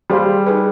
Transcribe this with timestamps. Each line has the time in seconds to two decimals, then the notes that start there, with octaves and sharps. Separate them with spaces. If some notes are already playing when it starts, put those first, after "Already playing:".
0.10 G3 G#4 C5 F5 B5
0.47 D#4 G#4 B4